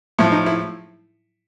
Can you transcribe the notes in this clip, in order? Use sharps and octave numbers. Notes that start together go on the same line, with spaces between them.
A2 F3 E4
D#4
E4